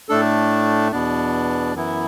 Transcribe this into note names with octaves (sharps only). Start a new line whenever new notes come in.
A2 A3 D4 A4
E2 B2 B3 D4
F#2 E3 B3 E4